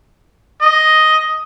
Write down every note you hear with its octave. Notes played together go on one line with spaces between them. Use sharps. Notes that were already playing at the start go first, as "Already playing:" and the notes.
D#5